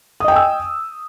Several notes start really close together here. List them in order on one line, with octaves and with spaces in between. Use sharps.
D#6 D#5 G5 G#5 E6